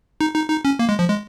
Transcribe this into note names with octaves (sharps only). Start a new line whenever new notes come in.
D#4
D#4
D#4
C#4
A#3
G#3
F3
G#3